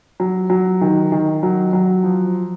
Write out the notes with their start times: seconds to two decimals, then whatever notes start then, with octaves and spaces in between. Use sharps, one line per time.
0.20 F#3
0.50 F#3
0.81 D#3
1.12 D#3
1.43 F#3
1.73 F#3
2.04 F3